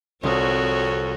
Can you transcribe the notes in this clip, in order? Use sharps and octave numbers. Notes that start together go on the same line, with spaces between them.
C2 F2 C4 F#4 C#5 D#6